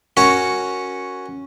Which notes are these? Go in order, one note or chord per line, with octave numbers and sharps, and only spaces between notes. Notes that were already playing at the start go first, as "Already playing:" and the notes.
C#4 F#4 A#4 C#5